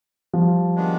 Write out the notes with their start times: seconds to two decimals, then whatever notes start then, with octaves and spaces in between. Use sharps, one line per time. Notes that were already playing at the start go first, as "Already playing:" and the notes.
0.33 F3 G3
0.75 D#3 G#3 B3 D4